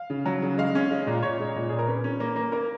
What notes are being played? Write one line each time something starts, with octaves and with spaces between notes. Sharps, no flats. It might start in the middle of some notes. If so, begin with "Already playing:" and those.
Already playing: F5
C#3
F#3
C#3
G#3 F5
C#4
G#3
A#2
A#2 C#5
G#3
A#2
A#2 G#4
A#4
C#4 B4
C#4
A#3
A#3
A#3 A#4